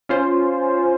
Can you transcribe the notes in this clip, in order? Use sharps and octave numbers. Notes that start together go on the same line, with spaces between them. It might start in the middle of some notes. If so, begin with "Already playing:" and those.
C#4 F4 C5